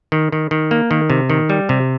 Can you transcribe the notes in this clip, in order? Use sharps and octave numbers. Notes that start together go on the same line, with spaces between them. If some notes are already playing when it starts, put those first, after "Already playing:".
D#3
D#3
D#3
A#3
D#3
C3
D#3
G3
C3